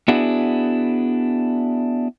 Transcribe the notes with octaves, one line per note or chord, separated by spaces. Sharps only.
B3 D4 E4 F#4 G#4